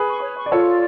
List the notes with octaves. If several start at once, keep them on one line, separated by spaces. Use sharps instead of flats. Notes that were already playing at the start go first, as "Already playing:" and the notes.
Already playing: G#4 B4
C#6
C#5
C#6
D5
F4 A4 C#5
D5